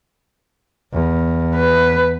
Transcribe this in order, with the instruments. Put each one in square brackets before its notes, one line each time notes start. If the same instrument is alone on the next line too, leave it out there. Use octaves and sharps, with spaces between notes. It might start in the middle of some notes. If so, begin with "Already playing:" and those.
[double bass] E2
[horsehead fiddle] B4